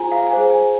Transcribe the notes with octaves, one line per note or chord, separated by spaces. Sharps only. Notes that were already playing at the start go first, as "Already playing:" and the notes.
Already playing: F4 G#4 C5 G#5 A#5
F5
G#5
G#4 C5 F5
G#5